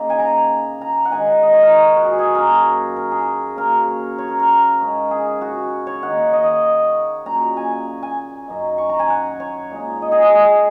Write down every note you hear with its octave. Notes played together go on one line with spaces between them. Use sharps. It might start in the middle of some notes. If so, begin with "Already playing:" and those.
Already playing: C#3 A#3 D#4
G#5
A#5
A#5
F#5
G#2 D#3 G#3 D#4 G#5
F#5
D#5
C#5
A#4
F#4
G#4
G#4
F#2 F#3 A#3 A#4
A#4
G#4
C#3 F#3 A#3 A#4
C#5
C#5
A#4
A#4
G#2 G#3 C#4
G#4
F#4
C#5
D#3 A#3 D#4 F#5
D#5
D#5
A#2 F#3 C#4 A#5
G#5
G#5
F#2 F#3 D#4
C#6
A#5
G#5
F#5
C#5
A#2 G#3 D#4
D#5
G#4
G#4
G#4